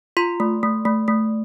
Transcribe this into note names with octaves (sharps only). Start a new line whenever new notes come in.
F4 C6
A3
A3
A3
A3